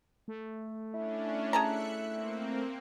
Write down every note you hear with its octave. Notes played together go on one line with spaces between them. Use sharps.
A3
C#4 D4 E4
G#4 E5 A5 A#5 F#6 C#7
A#3 C4